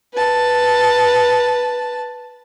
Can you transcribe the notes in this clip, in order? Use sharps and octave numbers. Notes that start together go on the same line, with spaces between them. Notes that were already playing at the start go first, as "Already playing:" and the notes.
B4 A5